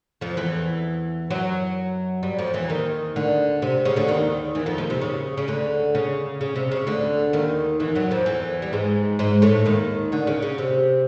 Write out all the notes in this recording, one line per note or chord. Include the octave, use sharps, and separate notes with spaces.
F2 F3
E2 E3
F#2 F#3
G2 G3
F2 F3
E2 E3
D#2 D#3
D2 D3
C3
C#3
D2 D3
D#2 D#3
E2 E3
F2 F3
D#2 D#3
C3
C#3
C#3
D2 D3
C#3
C#3
C3
C#3
D2 D3
D#2 D#3
E2 E3
F#2 F#3
F2 F3
E2 E3
G3
G#2 G#3
G#2 G#3
A2 A3
D#2 D#3
D2 D3
C#3
C#3
C3